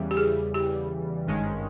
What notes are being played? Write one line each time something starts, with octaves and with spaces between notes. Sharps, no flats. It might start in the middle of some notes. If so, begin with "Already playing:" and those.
Already playing: E2 C#3 E3 G3
G4
G#4
G4
G#1 G2 D#3 G#3 C#4